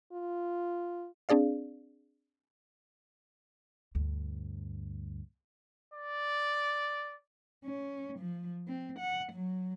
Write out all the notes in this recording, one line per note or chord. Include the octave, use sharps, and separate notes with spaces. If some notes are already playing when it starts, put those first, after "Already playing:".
F4
C4 D4 G#4 D5 F5
D2 G2
D5
C#4
F3
C4
F#5
F#3